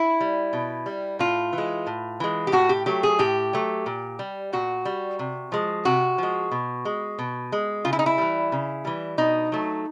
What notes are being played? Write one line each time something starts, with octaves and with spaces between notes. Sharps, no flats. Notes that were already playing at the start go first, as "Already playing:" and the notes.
Already playing: E4
G3
B2
G3
A2 F4
E3
G#3
A2
E3 G#3
G4
A2 F#4
G4
F#3 A3 G4
G#4
A2 G4
F#3 A3
A#2
G3
A#2 F#4
G3
C3
F3 G#3
C3 F#4
F3 G#3
B2
G#3
B2
G#3
C#3 F4
E4
D#4
E4
E3 G3
C#3
E3 G3
B2 D#4
F#3 A3